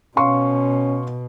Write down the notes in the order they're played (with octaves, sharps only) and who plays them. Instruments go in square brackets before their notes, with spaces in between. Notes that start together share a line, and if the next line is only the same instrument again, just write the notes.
[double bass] B2 [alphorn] C#4 [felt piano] F5 C6 C#6